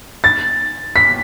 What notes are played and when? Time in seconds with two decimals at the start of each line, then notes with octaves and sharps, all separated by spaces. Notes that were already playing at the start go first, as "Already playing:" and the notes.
0.24 A6
0.96 B6